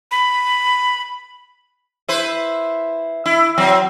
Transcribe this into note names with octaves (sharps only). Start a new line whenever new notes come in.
B5
E4 B4 C5
E4
F#3 C4